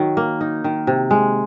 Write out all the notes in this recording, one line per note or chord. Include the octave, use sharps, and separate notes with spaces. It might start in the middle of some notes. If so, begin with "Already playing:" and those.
Already playing: D#3 F#3
A#3
D#4
D#3
C3
G#3